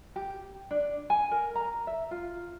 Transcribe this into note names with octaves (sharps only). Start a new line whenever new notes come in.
G4
D4
G#5
A#4
A#5
E5
F4